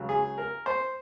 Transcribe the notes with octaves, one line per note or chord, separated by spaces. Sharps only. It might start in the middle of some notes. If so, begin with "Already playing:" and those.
Already playing: C#2 C#3 F#3
G#4
A#4
C5